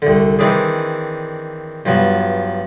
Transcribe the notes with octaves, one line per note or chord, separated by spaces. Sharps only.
C2 D3
D#3 E3 C4 D4 E4 G#4
G2 F3 F#3 B3